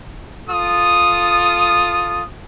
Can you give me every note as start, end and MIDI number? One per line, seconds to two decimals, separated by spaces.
0.49 2.23 65
0.49 2.23 69
0.49 2.23 87